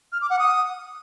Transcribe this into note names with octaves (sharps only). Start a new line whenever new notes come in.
F6
D6
F#5
D#6